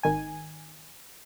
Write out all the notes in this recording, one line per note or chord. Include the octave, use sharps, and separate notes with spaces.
G#1 D#3 G#5